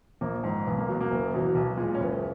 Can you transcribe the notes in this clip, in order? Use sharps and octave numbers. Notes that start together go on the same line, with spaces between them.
A#1 A#3
G#2 D#3
B1 B3
A#3
B2 F#3
A#3
F#1
E2 B2 F#3
B1
A#2 G#3
C#4
F#1 B3